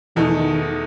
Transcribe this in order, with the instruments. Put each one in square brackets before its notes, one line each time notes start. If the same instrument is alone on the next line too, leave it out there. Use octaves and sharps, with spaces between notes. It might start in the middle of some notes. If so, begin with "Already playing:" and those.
[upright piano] E2 B2 A3 D#4 A4 [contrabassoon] E3
[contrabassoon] E3
D#3